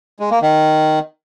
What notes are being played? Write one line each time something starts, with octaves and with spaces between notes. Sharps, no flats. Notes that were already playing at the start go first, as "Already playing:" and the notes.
G#3
A#3
D#3